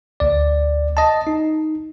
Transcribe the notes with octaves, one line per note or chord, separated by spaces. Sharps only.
D2 D5
D#5 A5
D#4